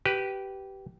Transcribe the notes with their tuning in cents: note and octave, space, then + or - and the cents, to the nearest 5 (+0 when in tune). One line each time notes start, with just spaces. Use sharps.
G4 -15 B4 +0